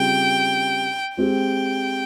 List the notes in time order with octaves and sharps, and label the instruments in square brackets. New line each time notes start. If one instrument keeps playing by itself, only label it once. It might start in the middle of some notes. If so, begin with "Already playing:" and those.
Already playing: [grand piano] C#3 G3 C4 F4 G#4 [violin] G5
[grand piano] G#3 C4 G4 [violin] G5